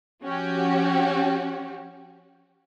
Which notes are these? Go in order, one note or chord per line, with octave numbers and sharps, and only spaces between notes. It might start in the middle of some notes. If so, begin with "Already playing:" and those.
F3 C#4 F#4 G4